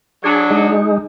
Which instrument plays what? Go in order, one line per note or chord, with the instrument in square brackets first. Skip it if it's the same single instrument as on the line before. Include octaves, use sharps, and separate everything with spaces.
[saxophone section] F#3 D4 [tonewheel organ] G#4
[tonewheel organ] G#3 D#4